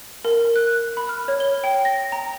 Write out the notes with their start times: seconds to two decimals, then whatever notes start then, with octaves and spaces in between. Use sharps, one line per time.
0.25 A#4
0.56 F#6
0.97 B5
1.09 F6
1.28 C#5
1.40 G7
1.64 G5
1.85 A#6
2.12 A#5